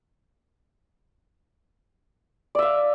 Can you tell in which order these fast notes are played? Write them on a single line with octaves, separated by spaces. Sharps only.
D5 E5 F5